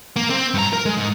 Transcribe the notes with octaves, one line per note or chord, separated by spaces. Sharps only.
A#3
C4
G2 A#5
A#4
G#3
G#2